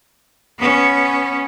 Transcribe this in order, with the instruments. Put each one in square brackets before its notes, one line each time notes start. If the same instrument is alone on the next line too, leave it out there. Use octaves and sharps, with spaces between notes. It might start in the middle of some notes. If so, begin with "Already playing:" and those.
[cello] B3 C#4